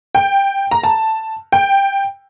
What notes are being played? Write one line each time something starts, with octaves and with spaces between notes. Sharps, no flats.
G5
A#5
A5
G5